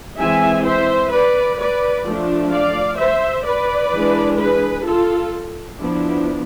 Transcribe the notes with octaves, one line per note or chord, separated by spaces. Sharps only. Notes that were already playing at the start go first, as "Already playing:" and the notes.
E3 G#3 C4 E5 G#5
C5 E5
B4 D5
B4 D5
F3 A3 D4
D5 F5
C5 E5
B4 D5
E3 G#3 D4
G#4 B4
F4 A4
F3 B3 D4 E4